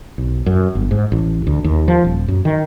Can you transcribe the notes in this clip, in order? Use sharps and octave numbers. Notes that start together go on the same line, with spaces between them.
B1
F#2
G1
G#2
A1
D2
D#2
F3
D#1
F#2
D#3